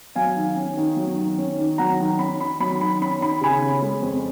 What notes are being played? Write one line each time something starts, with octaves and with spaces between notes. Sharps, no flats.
F#3 F5 G#5
D#3
C#4
D#3
F#3
D#3
C#4
D#3
F#3 F#5 A#5
D#3
C#4 B5
D#3 B5
F#3 B5
D#3 B5
C#4 B5
D#3 B5
C#3 G#5 B5
C#4
G#3
F2